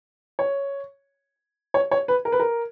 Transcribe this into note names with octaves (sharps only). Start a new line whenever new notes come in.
C#5
C#5
C#5
B4
A#4
B4
A#4